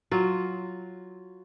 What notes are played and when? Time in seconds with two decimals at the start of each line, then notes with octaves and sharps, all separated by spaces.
0.11 F#3 F4